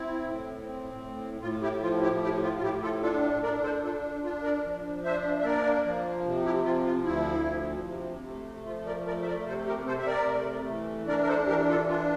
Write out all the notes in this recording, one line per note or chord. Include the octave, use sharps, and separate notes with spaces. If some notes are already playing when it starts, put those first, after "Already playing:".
Already playing: C4 E4
A2
C4
A2
A2 F4
E4 G4
F3 F4
E4 G4
A2 E4 G4
F4
F4
A2 E4 G4
F4 A4
D4 F4 A4
D4 A#4 D5
A4 C5
D4 F4 A4
D4 F4
A#4 D5
F3
D4 C5 E5
E5
A#3 A#4 D5
F3
C3
E4 G4
F3 F4
F4
D2 E4
F3
C3
A3
F3 F4
A#4 D5
A3 A#4 D5
E5
A#4 D5
C3 A4 C5
G4 A#4
C3 A4 C5
E5
A#4 D5
A3
E3
D4 A#4 D5
A#4
A4 C5
E3 G4 A#4
F4 A4
D4 F4